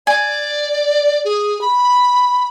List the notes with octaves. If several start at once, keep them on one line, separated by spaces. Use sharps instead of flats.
D5 G#5
G#4
B5